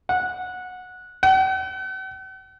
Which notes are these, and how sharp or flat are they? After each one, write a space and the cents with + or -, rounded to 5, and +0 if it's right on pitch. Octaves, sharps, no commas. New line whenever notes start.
F#5 -15
F#5 +45